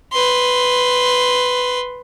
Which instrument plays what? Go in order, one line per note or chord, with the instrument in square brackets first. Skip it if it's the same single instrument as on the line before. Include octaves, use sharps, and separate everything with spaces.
[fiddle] B4 C6